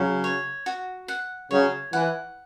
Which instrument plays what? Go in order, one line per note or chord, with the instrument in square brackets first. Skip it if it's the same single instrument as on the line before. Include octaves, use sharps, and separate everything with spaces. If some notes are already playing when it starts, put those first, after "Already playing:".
Already playing: [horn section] C#3 F#3
[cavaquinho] C#5
F#4
F#5
[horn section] C#3 F#3 [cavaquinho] C#5
[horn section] E3 [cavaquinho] F#5